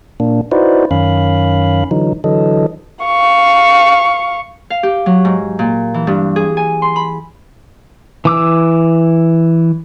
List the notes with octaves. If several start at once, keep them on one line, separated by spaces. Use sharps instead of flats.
A#2 A#3 D4
D#4 E4 F#4 B4 C5 D5
F#2 D#3 C#4 F5 B5
D3 E3 F#3 D#4
D3 E3 F#3 A4 D#5
F5 C#6
F5
G4
F#3
G#2
A#2
E3
G2
G#4
G#5
C6
B5
E3 D6 E6